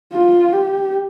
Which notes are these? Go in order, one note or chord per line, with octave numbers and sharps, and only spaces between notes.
F4
G4